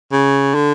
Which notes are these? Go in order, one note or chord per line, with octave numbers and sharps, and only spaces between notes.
C#3
D3